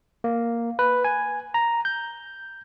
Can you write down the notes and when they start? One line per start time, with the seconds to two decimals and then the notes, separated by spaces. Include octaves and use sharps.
0.24 A#3
0.79 B4
1.04 G#5
1.54 A#5
1.85 G6